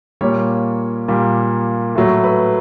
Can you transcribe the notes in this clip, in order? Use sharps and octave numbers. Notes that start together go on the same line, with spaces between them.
A#2 G3 A#3 C#5
A#2 G3 A#3
A2 F#3 A3
B4